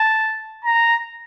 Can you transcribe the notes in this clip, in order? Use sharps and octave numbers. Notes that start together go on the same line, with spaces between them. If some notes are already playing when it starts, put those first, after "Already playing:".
Already playing: A5
A#5